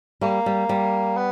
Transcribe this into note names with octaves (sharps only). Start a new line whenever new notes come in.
G3 A#3
G3
G3
B3